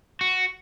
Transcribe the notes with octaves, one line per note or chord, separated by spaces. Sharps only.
F#4